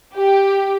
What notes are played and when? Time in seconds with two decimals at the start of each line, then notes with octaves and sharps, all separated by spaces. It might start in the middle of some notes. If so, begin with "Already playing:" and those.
0.14 G4